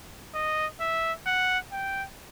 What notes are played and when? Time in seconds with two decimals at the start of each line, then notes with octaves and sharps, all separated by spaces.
0.34 D#5
0.80 E5
1.26 F#5
1.72 G5